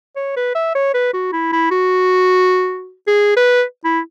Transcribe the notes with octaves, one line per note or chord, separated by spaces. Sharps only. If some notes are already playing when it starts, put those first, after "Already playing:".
C#5
B4
E5
C#5
B4
F#4
E4
E4
F#4
G#4
B4
E4